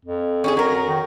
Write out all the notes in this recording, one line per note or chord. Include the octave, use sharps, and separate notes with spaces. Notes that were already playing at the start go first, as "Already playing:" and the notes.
F2
C#4 F#4 G#4
F#3 A#4
D#3